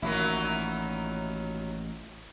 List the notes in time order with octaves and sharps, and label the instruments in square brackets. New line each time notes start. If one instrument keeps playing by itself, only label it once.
[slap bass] A1 A#2 [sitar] D#3 F#3 E4